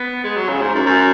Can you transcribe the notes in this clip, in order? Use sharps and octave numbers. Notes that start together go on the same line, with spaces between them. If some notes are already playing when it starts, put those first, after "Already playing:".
Already playing: B3
G#3
F#3
C#3
G#2
F#2
F#2